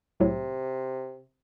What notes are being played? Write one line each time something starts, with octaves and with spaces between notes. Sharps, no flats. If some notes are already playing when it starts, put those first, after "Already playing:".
C2 A2 C3 F#3